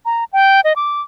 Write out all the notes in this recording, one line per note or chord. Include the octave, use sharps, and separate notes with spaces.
A#5
G5
D#5
D6